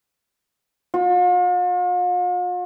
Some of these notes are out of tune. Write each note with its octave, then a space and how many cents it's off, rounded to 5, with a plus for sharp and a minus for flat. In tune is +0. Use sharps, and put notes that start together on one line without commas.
F4 +45